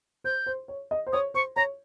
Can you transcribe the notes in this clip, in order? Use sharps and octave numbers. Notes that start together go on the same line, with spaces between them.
C5 G6
C5
C#5
D#5
C5
C#5 D#6
C5 C#6
C#5 A#5